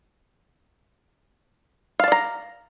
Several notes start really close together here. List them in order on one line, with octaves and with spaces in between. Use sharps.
F5 A5 D5 A#5